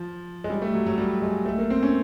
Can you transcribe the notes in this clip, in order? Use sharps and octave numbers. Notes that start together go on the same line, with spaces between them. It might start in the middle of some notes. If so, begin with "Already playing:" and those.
Already playing: F3
G#3
G3
A3
F#3
F#3
G3
G#3
A3
A#3
C4
C#4